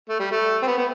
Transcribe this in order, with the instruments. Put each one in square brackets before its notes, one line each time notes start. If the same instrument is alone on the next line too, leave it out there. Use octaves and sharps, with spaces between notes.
[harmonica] A3
G3
A3
C4
B3
B3